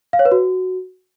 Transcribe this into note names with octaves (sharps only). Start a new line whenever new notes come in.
F5
C#5
B4
F#4